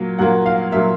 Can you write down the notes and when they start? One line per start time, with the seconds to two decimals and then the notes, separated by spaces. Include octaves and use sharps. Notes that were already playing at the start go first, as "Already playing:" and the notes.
Already playing: A#2 F#3 A#3
0.18 A#2 F#3 A#3 F#5
0.46 F5
0.72 A#2 F#3 A#3 E5